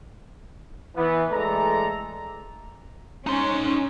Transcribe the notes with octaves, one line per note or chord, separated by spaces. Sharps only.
E3 B3
E3 G#3 A3 A4 D5 A#5
C#4 D#4 C6